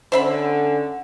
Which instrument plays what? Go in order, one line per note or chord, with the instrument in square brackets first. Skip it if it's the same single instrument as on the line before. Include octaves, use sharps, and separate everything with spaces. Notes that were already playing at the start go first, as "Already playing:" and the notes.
[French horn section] D3 C#4 [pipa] C5 E5 B5